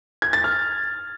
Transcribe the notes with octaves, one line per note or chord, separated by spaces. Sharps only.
G#6
A6
F6